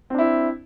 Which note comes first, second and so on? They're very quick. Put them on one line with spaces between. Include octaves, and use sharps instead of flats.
C4 D4 E4